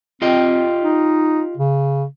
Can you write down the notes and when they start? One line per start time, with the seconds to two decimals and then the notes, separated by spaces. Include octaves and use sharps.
0.22 C4 F4 G4 D#5
0.82 D#4
1.57 C#3